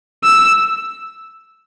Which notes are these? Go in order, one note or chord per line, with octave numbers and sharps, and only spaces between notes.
E6